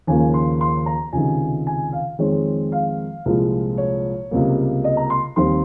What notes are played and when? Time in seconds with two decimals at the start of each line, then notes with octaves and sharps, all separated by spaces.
0.07 D#2 C#3 F3 A#3 G#5
0.34 C6
0.61 C6
0.86 A#5
1.13 C#2 C3 D#3 G#5
1.67 G#5
1.93 F5
2.19 F2 D#3 G#3 C4 C#5
2.72 F5
3.26 C2 A#2 F3 G#3
3.78 C#5
4.31 C#2 C3 G3 A#3
4.84 D#5
4.97 A#5
5.10 C6
5.36 D#2 D#3 G3 C4 C6